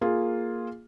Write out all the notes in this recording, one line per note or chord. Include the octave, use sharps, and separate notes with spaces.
A#3 F4 G#4